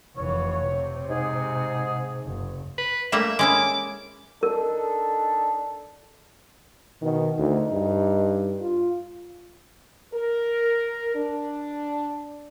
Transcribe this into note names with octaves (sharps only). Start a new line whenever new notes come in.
F1 E3 C#5
C3
G#2 G#4
F#1
B4
G3 A3 A#3 E5
G#3 C#4 E4 D6
D4 D#4 A4 A#4
B2 D#3
D2 D#4
G2
F4
A#4
D4